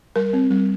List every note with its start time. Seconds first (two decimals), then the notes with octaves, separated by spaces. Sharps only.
0.16 G3 A#4
0.33 C4
0.51 G3